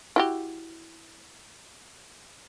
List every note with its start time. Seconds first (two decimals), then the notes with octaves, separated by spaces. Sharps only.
0.16 E4 F#4 G4